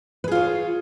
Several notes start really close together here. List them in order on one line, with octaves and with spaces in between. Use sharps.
B4 G#4 F4 C#5